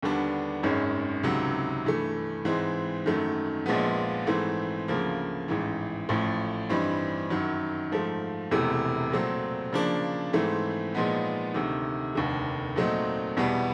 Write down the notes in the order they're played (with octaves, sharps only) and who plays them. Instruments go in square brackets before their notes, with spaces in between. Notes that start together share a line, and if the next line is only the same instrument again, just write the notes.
[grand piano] D#2 D3 G3 B3 D4
G#1 F#2 D#3 G#3 C#4
C#2 C3 D#3 F#3
G2 E3 A3
G#2 E3 G#3 C4
F#2 D#3 F#3 A3
A#1 A#2 F3 G#3 B3
G#2 E3 A3 C4
D2 C#3 F3 A#3
A1 G#2 E3
A1 A2 F3
G2 E3 G3 C4 D#4
F#2 D#3 F#3
G#2 F3 A3
E1 E2 C3 E3 A3
A#2 F#3 A3 C4
C#3 F3 A#3 D4
G#2 E3 A3 C4
A#2 F3 G#3 B3 D#4
D2 C3 D#3
F1 D#2 D3
A#2 F#3 A3 C4 D#4
E2 B2 G3 B3